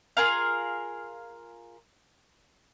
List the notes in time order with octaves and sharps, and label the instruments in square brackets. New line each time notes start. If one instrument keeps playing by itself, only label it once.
[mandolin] F4 G#4 A#4 F5